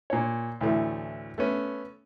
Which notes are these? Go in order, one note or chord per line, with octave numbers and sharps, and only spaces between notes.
A#2 C#5
D2 A2 E3 A3
A3 B3 C#4